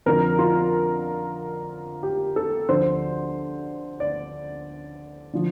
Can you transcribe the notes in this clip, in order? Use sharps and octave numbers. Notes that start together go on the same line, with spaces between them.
F2 D3 F3 A#4
F4
G4
A4
D2 D3 F3 C5
D5
D3 F3